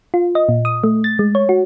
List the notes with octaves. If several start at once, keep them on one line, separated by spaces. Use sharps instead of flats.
F4
D#5
A#2
D#6
A3
A6
G#3
C#5
F#4